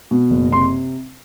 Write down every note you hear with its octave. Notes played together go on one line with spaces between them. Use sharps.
B2
F#1
C3 C6